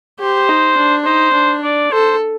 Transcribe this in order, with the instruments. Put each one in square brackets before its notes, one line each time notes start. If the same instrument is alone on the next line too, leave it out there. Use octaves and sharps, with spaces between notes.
[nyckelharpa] G4 [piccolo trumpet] C5
[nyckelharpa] D#4
D4
[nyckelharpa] D#4 [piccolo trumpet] C5
[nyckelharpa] D4
[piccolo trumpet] D5
[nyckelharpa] A4 [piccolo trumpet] C5